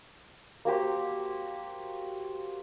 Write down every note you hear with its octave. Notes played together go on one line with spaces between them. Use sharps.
A#3 F#4 G4 C5